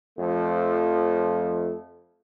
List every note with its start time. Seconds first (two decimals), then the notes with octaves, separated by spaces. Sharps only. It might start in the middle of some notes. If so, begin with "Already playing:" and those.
0.18 F2 F3 A3